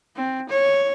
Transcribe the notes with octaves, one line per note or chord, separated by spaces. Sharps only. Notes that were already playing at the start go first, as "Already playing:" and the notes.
C4
C#5